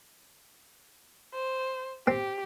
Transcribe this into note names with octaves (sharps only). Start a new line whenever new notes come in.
C5
C4 G4